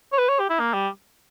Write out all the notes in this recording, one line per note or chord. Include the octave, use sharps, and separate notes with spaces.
C#5
B4
C#5
G4
E4
A#3
G3